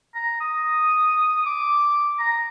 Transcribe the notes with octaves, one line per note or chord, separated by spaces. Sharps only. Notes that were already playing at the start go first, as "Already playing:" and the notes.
A#5
D#6
D6
A#5